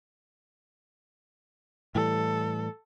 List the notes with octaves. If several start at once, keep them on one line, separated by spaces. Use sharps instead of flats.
A2 E3 G3 A4